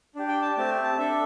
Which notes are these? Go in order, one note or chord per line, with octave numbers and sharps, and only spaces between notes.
D4 G4
G5
A5
A3 C4 G4 A5
A5
D4 A4 E5